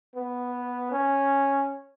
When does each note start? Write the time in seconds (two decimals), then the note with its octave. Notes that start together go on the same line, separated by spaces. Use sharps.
0.16 B3
0.92 C#4